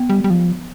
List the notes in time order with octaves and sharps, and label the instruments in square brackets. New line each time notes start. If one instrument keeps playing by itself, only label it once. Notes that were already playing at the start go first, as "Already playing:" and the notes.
Already playing: [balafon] B3
[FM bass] G3
G3
F3